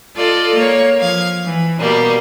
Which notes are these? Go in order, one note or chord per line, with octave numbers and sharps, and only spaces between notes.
F4 A4 D5 D#5
A#3 C#5
F3 F5 G#6
E3
B2 G3 A#3